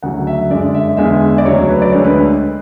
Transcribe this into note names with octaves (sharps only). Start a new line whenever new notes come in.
D2 C#3 F#3 F#5
E5
F#2 D3 G#3 D5
E5
E2 D3 G#3 E5
D5
D2 C#3 F#3 C#5
B4
D5
D2 D3 G#3 C#5
B4